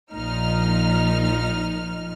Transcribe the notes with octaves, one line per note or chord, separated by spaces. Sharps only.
A#1 A#2 F3 D#4 F6